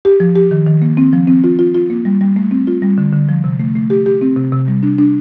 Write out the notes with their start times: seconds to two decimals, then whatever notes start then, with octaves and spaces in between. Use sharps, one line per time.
0.05 G4
0.20 F3
0.36 G4
0.51 D#3
0.67 D#3
0.82 A#3
0.97 C4
1.13 F3
1.28 C4
1.44 F4
1.59 F4
1.75 F4
1.90 A#3
2.05 G3
2.21 G3
2.36 A3
2.51 C4
2.67 F4
2.82 G3
2.98 D3
3.13 D3
3.29 F3
3.44 C3
3.60 A3
3.75 A3
3.90 G4
4.06 G4
4.21 C4
4.36 C3
4.52 C3
4.68 G3
4.83 D4
4.98 D4